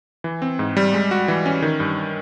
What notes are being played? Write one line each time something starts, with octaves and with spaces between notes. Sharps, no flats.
E3
C4
G#2
G3
G#3
F#4
E3
C#4
D#3
G2